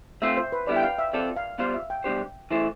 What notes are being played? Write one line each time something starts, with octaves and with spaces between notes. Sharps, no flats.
A3 C4 F4 E5
C5
B4
D3 G3 B3 E4 D5
G5
F5
E5
F3 C4 F4 A4 D5
F5
G3 B3 F4 C5 F5
E5
G5
B2 G3 D4 G4 C5
E3 A3 E4 A4 C5